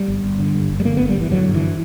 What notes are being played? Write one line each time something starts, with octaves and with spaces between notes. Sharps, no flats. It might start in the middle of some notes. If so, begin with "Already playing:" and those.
Already playing: G3
G1
G1
D3
G2
G1
G3
D3 A#3
G1 B3
G3
G1 E3
D3 F#3
G2
E3